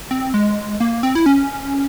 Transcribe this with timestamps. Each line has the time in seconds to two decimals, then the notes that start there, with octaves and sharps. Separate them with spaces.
0.11 C4
0.34 G#3
0.80 A#3
1.03 C4
1.15 E4
1.26 C#4